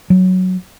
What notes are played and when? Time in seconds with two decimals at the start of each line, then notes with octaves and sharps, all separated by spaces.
0.10 F#3